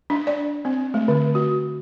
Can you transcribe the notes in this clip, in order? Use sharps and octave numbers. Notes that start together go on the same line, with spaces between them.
D4
D5
C4
A3
D3
F#4